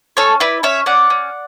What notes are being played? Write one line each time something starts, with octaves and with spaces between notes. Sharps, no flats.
C#4 A4 C#5
E4 B4 D5
C#4 C#5 E5
C#4 D5 F#5
C#4